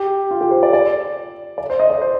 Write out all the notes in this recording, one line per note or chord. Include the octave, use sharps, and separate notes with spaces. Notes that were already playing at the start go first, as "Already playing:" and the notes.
Already playing: G4
F4
G4
C5
D5
D5
D5
C5
D#5
D5
C5